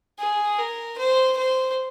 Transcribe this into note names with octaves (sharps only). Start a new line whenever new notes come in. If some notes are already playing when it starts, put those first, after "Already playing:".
G#4
A#4
C5
C5